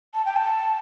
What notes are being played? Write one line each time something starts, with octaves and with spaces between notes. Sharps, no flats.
A5
G5
A5